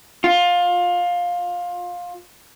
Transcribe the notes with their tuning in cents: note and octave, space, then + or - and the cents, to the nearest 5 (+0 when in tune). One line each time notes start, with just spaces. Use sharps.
F4 +20